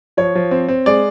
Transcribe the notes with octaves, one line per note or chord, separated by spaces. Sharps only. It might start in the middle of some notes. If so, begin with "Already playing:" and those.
F3 C#5
F3
C4
C4
G#3 D5